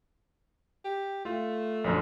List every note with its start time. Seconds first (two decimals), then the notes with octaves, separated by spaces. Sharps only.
0.84 G4
1.25 A3 F4
1.84 A#1 F#2 D3